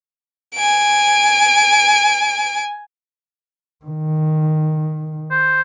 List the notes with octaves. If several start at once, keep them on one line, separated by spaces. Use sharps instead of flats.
G#5 D7
D#3
C5